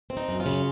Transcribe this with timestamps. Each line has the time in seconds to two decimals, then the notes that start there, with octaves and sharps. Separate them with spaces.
0.10 C4
0.17 D#4
0.29 F#2
0.40 C#4 F4
0.46 C#3